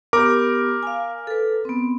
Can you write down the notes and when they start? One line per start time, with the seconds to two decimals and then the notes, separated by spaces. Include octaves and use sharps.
0.13 B3 G4 A#4 D6
0.83 F5 G#5
1.27 A4 B4
1.65 B3 C4